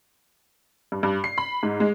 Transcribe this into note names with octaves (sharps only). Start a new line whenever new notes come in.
G2
G2
C7
B5
G#2
G#3